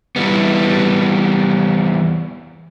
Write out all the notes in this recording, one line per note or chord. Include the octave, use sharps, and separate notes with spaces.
E3 G3 B3